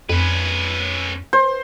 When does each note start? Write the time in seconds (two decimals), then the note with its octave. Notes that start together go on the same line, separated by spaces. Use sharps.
0.09 F2 C#4 B4
1.33 C5